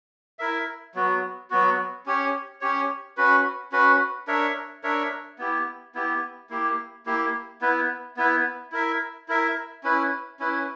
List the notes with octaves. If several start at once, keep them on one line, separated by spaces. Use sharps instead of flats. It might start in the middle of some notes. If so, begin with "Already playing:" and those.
E4 A#4 E5
F#3 B3 F#4
F#3 B3 F#4
C#4 G4 C#5
C#4 G4 C#5
C#4 F#4 B4
C#4 F#4 B4
D4 A#4 C#5 E5
D4 A#4 C#5 E5
B3 E4 G4
B3 E4 G4
A#3 E4 G4
A#3 E4 G4
B3 E4 B4
B3 E4 B4
E4 A#4 E5
E4 A#4 E5
C#4 E4 B4
C#4 E4 B4